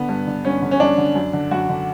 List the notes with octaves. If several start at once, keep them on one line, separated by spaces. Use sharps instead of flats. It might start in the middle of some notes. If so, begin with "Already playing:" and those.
Already playing: D3 B3
G2
D3
G2 C#4
D3
C#4
G2 D4
D3
F#2
D3
F#2 F#4
D3